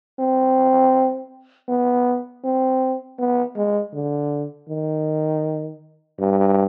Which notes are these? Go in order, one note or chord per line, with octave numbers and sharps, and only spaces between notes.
C4
B3
C4
B3
G#3
D3
D#3
G2